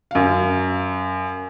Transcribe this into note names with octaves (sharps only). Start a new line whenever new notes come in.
F#2 F5